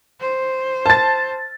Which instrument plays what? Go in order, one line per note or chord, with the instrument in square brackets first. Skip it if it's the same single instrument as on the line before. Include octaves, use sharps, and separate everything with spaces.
[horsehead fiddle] C5
[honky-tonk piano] A5 A6